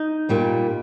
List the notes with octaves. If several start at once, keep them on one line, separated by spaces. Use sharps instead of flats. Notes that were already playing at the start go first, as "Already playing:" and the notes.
Already playing: D#4
A#2 G3 A#3